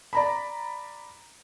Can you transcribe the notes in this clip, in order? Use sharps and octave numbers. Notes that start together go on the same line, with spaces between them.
D5 A#5 B5